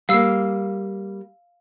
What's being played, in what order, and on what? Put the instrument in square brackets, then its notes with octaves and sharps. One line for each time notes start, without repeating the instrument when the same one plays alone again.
[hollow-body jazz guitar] G3 A#3 [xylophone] F5 E6 C7